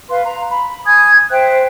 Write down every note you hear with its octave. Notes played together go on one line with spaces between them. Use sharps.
B4 F5 C6
A#5
B5
G#5 D#6 G#6
C5 E5 G5 F#6